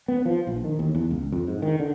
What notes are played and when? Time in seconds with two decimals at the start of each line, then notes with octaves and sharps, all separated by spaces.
0.08 B3
0.26 F3
0.47 A#1
0.64 D#3
0.79 D#2
0.95 E2
1.11 C#2
1.32 F2
1.47 G#2
1.62 D#3
1.80 D3